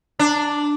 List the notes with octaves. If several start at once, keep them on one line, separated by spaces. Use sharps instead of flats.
D4